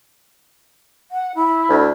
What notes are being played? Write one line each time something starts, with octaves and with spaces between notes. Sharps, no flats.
F#5
E4
D2